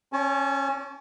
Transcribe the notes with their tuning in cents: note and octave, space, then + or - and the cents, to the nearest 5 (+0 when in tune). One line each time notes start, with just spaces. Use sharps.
C#4 -20 C#5 +35 A5 -45